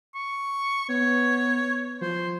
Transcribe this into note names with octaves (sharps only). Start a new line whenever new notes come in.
C#6
B3 C#5
F3 C5